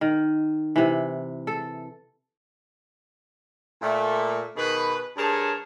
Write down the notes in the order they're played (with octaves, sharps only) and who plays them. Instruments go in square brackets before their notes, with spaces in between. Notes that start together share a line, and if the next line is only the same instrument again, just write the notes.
[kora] D#3
C3 E3
A4
[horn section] A#2 A3
B2 D#3 G#4 B4
G2 G#4 A#4 C#5 A5